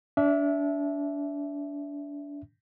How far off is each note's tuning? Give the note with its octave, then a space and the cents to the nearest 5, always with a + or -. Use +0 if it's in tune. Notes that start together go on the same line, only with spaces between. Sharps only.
D4 -30 E5 +0